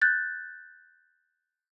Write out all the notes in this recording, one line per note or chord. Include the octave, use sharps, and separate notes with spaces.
F#6 G6 A6